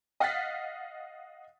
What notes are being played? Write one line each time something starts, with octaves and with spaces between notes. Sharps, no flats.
D#5 F5 F#5 F#6 A6 B6